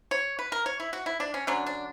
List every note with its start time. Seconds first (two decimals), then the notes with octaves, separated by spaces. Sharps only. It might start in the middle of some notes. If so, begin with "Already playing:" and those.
0.11 C#5
0.39 B4
0.52 A#4
0.66 C#5
0.80 E4
0.93 F#4
1.06 E4
1.20 D4
1.34 C#4
1.47 D3 F#3 C#4 D4
1.66 D4